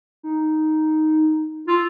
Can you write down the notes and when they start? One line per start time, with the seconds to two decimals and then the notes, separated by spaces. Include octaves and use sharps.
0.23 D#4
1.68 F4 E6